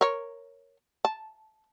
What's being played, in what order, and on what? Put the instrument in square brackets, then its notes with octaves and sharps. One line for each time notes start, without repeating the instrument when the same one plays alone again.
[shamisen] A#4 C#5
A5